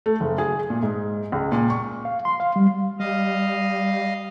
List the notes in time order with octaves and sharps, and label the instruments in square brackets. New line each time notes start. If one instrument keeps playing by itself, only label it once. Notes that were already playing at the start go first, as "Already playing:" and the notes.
[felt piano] A3
F#1
G#4
A#2
G#2
C#2
A#2
C#6
[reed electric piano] F5
C6
F5
G3
[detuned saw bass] G3 [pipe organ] D#5 F5